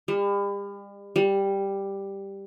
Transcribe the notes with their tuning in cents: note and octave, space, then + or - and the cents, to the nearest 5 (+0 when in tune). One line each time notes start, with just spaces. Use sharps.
G3 +40
G3 +5